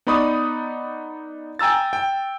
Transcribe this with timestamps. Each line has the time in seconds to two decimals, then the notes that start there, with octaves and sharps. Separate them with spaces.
0.07 B3 D#4 D5 B5 C#6 D#6
1.59 G5 G#5 A#5 E6 A6
1.93 G5